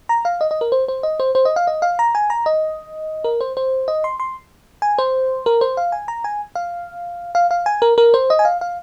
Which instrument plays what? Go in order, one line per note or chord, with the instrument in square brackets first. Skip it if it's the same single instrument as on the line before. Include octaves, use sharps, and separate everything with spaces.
[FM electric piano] A#5
F5
D#5
D#5
A#4
C5
C5
D#5
C5
C5
D#5
F5
D#5
F5
A#5
G#5
A#5
D#5
A#4
C5
C5
D#5
C6
C6
G#5
C5
A#4
C5
F5
G#5
A#5
G#5
F5
F5
F5
G#5
A#4
A#4
C5
D#5
G#5
F5
F5